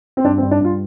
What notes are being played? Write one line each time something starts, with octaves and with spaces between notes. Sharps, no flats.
C4
G2 D4
C4
G2
D4
G2 F4